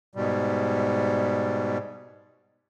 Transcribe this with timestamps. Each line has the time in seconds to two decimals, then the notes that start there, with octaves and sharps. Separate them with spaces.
0.15 G#2 B2 G3